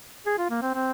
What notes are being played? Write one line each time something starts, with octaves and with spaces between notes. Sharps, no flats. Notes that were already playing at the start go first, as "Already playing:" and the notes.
G#4
F4
A#3
C4
C4